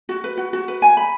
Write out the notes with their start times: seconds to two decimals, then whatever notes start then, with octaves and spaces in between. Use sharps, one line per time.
0.09 F#4
0.24 B4
0.37 F#4
0.53 F#4
0.68 B4
0.82 G#5
0.97 B5